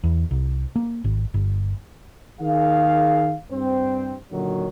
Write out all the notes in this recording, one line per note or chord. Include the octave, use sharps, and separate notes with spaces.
E2
C2
A#3
G#1
G1
D#3 G#4 F5
G2 C4
A#2 D3 D#3 F#3